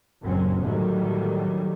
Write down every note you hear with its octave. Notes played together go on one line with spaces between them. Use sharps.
F#1 D#2 A#2 F#3 C4 C#4
A2 D3 D#3 F#3 G3 A3